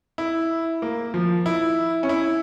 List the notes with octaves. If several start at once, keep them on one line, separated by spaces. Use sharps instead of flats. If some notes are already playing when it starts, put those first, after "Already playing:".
E4
A#3
F3
E4
C#4
E4